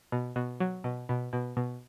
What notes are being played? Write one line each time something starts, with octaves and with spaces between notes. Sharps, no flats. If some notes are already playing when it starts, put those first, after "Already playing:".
B2
B2
F#3
B2
B2
B2
B2